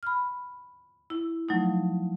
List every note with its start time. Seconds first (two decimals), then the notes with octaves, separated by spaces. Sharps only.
0.03 B5 F6
1.10 E4
1.49 F3 F#3 A3 D#4